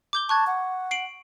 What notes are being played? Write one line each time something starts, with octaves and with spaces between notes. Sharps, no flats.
D6 G6 G7
A5 C#6 F#6 G#6
F#5
C7 D7 F#7